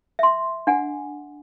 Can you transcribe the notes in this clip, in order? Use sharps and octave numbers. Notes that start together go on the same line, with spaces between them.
E5 C6
D4 F#5 G#5